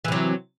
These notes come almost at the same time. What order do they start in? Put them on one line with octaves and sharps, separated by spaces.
E3 C3 F#3